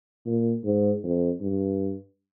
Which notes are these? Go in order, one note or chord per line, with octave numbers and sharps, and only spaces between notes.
A#2
G#2
F2
G2